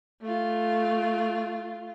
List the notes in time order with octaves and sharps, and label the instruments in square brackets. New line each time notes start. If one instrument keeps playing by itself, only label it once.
[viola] A3 F4